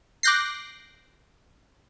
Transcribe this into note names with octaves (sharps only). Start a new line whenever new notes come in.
D6 F#6 G6 A#6 C7